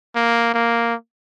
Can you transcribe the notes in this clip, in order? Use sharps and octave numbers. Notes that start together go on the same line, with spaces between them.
A#3
A#3